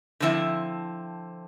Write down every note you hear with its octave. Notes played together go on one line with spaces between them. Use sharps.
D3 F3 C4 E4